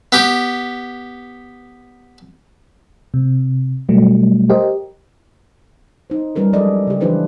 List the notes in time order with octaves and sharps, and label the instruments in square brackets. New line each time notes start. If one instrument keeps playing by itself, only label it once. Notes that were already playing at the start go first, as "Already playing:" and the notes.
[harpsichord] B3 G4
[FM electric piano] C3
B2 F#3 G3 A3
G4 A#4 C5 D#5
[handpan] D#4 C5
G3 C#4 A#4 B4
F3 F#3 G#3 A4 D5 D#5
C#3 G4
E3 F3 D4 E4 B4 C5